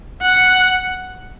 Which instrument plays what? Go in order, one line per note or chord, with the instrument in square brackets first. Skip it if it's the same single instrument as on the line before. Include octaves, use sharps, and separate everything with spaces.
[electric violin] F#5